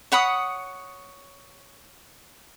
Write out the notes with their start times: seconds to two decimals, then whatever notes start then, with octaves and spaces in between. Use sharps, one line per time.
0.12 C#5 F#5 B5 D#6